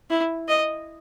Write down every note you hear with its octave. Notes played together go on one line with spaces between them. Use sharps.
E4
D#5